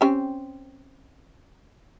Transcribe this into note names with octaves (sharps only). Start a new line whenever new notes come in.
C4 C#4 G4